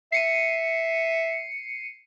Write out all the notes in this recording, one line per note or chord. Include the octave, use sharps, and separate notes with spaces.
E5 C7 C#7 D#7